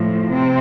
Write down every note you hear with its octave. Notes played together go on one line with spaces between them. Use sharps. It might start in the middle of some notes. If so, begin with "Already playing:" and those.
Already playing: A2 F3
C3 C4